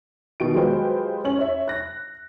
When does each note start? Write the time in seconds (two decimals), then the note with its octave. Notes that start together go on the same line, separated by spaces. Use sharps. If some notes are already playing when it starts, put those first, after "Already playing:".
0.40 B2 D#3 D7
0.54 F#3 G#3 F4 G4 B4 C5
1.25 C#4 F#7
1.39 C#5 E5
1.68 F#6 A#6